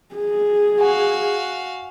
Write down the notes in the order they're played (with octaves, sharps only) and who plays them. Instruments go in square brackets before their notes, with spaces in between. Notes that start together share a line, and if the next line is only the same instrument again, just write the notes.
[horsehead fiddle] G#4
[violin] F#4 F5 [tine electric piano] G#5